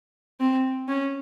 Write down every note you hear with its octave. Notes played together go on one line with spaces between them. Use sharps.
C4
C#4